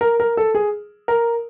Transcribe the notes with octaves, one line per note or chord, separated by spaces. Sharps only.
A#4
A#4
A4
G#4
A#4